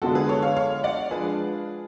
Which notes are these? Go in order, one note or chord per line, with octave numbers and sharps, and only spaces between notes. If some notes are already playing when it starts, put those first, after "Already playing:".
D3 G#3 B3 D4 F4 F#4 A4
G#4 B4
A4 C#5
C#5 F5
C#5 F5
D5 F#5
F3 G#3 D4 F4 G#4 B4